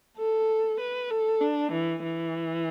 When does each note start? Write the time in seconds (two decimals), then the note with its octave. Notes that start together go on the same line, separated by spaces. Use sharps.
0.17 A4
0.80 B4
1.11 A4
1.41 D4
1.72 E3
2.03 E3